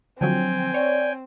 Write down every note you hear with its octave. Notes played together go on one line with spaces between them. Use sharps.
D3 F3 F#3 C4 G5 G#5
C#5 D5